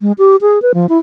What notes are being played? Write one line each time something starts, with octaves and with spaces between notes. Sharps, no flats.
G#3
G4
G#4
B4
F3
E4